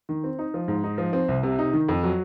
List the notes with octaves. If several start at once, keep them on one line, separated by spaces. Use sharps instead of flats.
D#3
C4
D#4
F3
G#2
D#4
F3
C4
C2
C3
D#4
D#3
F2
F#3